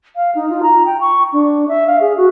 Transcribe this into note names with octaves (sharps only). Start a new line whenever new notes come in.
F5
D#4
F4
A#5
G5
C#6
D4
E5
F5
G#4
F#4